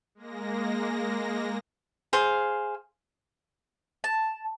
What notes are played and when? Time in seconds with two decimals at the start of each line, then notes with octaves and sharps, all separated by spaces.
0.15 G#3 A#3 A#6
2.13 G#4 C5 F5
4.04 A5